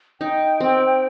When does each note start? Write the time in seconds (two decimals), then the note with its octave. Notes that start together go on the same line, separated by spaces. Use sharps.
0.21 D#4 G5
0.61 C4